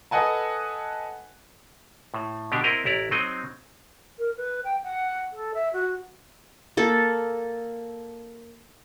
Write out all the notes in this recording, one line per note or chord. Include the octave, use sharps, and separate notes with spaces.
A4 B4 D#5 F#5 G#5 A5
A2
B2 D3 D4 G4
C4 E4 A#4 D#5
A1 E4 D5 A#5
F#3 C4 D#4 D#5
A#4
B4
G5
F#5
A4
E5
F#4
A#3 A4